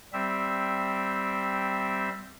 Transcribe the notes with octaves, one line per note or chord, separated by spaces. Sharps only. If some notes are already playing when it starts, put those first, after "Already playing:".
G3 C4 E5